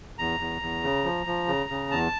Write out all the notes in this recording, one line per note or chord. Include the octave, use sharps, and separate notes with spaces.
E2 A#5
E2
E2
C#3
F3
F3
C#3
C#3
E2 A5